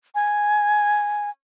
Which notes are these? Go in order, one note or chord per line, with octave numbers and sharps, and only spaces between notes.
G#5